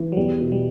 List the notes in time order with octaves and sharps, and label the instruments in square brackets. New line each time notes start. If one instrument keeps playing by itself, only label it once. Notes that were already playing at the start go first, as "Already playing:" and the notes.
Already playing: [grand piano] E3
[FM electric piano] F#3
[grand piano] E2 [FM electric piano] G3
[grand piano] B2
[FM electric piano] G3